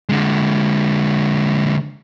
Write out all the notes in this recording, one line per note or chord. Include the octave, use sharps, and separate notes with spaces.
D3 G#3